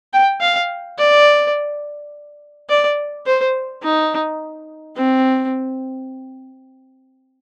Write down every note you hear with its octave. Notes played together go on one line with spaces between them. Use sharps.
G5
F5
D5
D5
C5
D#4
C4